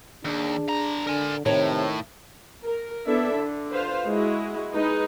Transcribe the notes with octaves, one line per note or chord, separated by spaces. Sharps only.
D#2 D4 G#4
D3 A#5
D3 A#4 G#5
A2 C3 D#3 C#5 A5 A#5
A#4
B3 D4 E4 A4 E5
D3
F4 B4 C5 F5
G#3 E4 F#4
G#3 D#4 B4